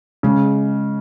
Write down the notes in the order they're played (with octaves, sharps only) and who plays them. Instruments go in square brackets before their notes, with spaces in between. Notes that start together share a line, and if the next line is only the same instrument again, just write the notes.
[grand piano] C#3 [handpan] G#3